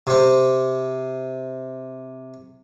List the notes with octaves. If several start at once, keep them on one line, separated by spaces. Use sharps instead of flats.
C3 C4